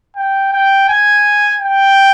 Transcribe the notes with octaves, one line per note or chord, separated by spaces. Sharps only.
G5
G5
G#5
G5